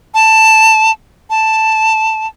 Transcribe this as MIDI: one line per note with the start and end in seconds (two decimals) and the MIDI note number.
0.14 0.91 81
1.30 2.27 81